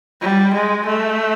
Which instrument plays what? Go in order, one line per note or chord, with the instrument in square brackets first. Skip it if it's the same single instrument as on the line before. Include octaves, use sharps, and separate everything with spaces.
[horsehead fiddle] G3
G#3
A3